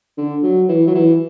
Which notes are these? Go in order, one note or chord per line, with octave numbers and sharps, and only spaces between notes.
D3
F#3
E3
F#3
E3